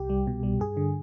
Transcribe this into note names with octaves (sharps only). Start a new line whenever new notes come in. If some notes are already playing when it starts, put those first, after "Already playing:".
Already playing: C2 G4
G3
B2
G3
G2 G#4
D3